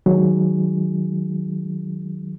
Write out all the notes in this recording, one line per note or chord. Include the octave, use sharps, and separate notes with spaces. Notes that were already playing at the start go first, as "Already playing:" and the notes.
D#3 F#3 G#3 D#4 G#4